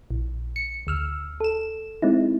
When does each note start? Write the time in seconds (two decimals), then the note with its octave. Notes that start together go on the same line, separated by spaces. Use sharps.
0.11 A#1
0.56 C#7
0.87 D2 E6 F6
1.40 A4 E7
2.02 G#3 C4 D#4 E4